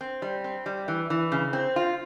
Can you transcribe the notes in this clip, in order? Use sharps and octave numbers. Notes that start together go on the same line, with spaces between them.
C4
G3
C4
G3
E3
E3
C#3
C4
F4